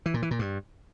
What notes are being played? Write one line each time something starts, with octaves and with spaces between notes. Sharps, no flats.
E3
A#2
E3
A#2
G2